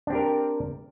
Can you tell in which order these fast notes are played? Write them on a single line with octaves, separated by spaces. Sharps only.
D4 C4 G4 A#4